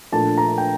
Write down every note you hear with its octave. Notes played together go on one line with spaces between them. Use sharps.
A#1 A#2 A3 D4 A5
A#5
G5